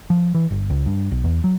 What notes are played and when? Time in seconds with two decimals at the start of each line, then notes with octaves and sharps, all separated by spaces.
0.10 F3
0.35 E3
0.51 G1
0.70 C#2
0.86 G2
1.11 B1
1.24 E2
1.44 F#3